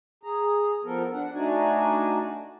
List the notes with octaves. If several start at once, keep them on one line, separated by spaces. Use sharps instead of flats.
G#4 A#5
F3 B3 A4 A#4
D4 F#5
A3 D4 D#4 F#4 D5 G#5